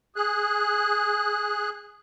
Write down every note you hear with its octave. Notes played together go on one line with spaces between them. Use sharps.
G#4 F#6